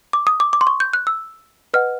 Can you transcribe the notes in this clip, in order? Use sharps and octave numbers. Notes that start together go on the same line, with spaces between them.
D6
D#6
D6
D6
C6
C#6
G6
F#6
E6
B4 D#5 F#5 F6